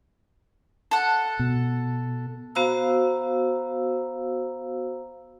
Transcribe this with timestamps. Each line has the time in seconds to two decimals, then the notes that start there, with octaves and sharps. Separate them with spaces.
0.91 A4 F#5
1.39 B2
2.55 B3 F#4 C5 F5 A#5 E6